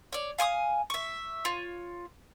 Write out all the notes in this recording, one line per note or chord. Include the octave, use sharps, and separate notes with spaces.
C#5 D5
F5 G#5 C#6 D#6
E5 C#6
F4 C#5